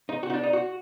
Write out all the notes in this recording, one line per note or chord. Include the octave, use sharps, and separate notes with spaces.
D#4
F#4
D#4
D4
D#4
F#4